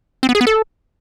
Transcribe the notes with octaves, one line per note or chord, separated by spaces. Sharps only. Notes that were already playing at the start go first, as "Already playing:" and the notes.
C4
B3
G#4
B3
A4